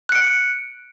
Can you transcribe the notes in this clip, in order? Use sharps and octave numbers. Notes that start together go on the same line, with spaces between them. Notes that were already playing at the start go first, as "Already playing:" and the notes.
F#6 C#7 D7